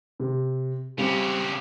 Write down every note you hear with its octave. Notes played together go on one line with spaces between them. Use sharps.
C3
C#3 G3 C4 G4 F7